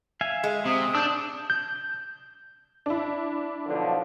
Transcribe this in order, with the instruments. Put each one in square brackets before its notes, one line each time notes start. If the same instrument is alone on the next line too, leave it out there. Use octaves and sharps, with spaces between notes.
[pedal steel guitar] E5 F5 G#5
[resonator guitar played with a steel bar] G#3
[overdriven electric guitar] C3 [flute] D#6
[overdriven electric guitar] D4 [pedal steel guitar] E6 G6
[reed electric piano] G6
[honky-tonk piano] D4 E4
[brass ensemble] B1 D3 F3